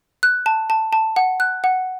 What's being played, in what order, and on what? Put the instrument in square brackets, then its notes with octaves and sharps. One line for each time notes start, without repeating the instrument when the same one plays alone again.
[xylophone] F#6
A5
A5
A5
F#5
F#6
F#5